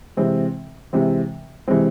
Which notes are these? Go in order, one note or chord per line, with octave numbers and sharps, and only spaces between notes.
C3 E3 G#3 C4
C3 E3 G#3 C4
C3 E3 G#3 C4